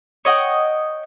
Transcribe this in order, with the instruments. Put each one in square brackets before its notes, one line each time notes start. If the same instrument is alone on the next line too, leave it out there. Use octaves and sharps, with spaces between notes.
[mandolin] C#5 D#5 F#5 G5